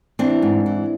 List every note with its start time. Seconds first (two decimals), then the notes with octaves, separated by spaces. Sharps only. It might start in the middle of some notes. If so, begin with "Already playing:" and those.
0.19 E3 C4 D4
0.42 G#2
0.66 E3